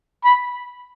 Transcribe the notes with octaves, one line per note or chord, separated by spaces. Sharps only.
B5